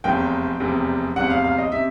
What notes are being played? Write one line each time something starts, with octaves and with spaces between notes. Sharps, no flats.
F1 E2 C3 G5
F1 E2 C3
F1 E2 C3 F#5
F5
F5
D#5
C3 E5